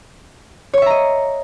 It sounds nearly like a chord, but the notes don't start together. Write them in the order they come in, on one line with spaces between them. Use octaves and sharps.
C#5 C#6 E5 A#5 D#5